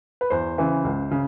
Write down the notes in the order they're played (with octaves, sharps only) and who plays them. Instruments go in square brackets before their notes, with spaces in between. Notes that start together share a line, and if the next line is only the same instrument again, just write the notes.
[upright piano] B4
E2 C5
C#3 E3
C#2
C#3